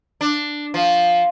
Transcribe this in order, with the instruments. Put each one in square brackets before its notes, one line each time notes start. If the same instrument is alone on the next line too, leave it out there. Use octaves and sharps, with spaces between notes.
[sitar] D4
F3